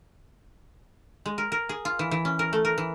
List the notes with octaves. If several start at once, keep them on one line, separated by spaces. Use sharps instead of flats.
G#3
A#4
A#4
G#4
F4
E3
E3
C#4
A#4
A3
A#4
E3